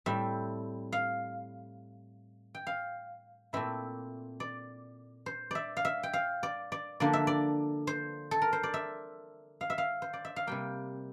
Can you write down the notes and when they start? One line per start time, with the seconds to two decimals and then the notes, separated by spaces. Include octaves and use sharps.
0.06 A2 G3 C4 E5
0.92 F5
2.55 G5
2.67 F5
3.53 A#2 A3 C4 E4 E5
4.40 D5
5.26 C5
5.51 D5 E5
5.77 F5
5.85 E5
6.03 G5
6.13 F5
6.43 D5
6.72 D5
7.00 D3 F3 A#3 D4 D5
7.13 E5
7.27 D5
7.87 C5
8.31 A4
8.42 A#4
8.53 C5
8.63 D5
8.74 E5
9.61 F5
9.70 E5
9.78 F5
10.02 C5
10.13 D5
10.25 E5
10.36 F5
10.47 C3 G3 A#3 G5